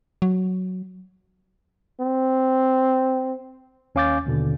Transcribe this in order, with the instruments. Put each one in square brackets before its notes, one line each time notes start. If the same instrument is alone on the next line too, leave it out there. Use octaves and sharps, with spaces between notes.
[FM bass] F#3
[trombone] C4
[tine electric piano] D#2 C#4 F5 D6 G6 A6
D#2 B2 D3